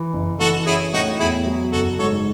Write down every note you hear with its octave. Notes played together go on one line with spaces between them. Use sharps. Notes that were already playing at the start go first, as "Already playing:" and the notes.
Already playing: E3
F#1
E3 F#4 A4
C#4 E4 G#4
A2 D#4 F#4
E2 E4 G#4
F#3
F#1 F#4 A4
G#2 A4 C#5